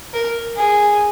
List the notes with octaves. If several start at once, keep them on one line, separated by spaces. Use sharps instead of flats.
A#4
G#4